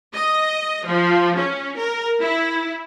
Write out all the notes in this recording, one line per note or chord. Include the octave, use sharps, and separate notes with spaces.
D#5
F3
C#4
A#4
E4